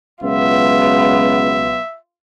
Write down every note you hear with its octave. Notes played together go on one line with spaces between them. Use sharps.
C#2 B2 F#3 B3 F4 E5